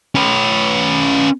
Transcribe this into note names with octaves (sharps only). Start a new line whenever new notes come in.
C#4 B4